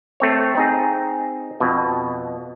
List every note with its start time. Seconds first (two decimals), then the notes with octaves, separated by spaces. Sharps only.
0.20 A3 C4 C#5
0.55 C4 D#4 G#4
1.60 F2 B2